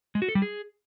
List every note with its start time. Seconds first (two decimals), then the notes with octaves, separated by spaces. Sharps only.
0.15 G#3
0.22 F#4
0.29 A4
0.35 G3
0.42 G#4